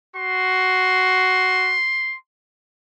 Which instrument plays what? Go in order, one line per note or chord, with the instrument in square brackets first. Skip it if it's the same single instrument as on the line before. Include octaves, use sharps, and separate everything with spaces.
[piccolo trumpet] F#4 [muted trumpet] C6